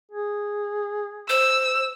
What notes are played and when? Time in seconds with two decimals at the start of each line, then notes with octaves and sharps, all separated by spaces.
0.11 G#4
1.29 C5 E6